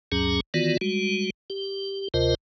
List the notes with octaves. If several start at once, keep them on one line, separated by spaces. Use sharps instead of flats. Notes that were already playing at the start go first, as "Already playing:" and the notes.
D2 G2 F#3 C#4 G#4 A#5
D#3 E3 B3 F4 F#4 D5
G3 G#3 F#4
G4
D2 C3 F4 A#4 C5 D#5